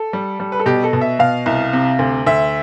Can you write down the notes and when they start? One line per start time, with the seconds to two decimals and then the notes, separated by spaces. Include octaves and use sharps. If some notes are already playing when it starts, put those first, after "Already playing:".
Already playing: A4
0.13 G3
0.40 G3
0.52 B4
0.60 A4
0.66 B2 G4
0.84 A4
0.93 B2
1.01 E5
1.19 B2 F5
1.46 C2
1.73 C3
1.99 D2
2.27 D2 E5